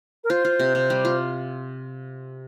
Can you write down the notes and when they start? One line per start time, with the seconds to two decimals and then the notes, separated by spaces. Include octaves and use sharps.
0.24 A#4
0.30 F4 C5
0.45 F4
0.60 C3
0.75 C3
0.90 G3
1.05 F4